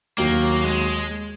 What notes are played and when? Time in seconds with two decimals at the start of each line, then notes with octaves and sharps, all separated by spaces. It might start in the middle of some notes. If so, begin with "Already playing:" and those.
0.18 D#2 D#3 F#3 A#3
0.64 G#3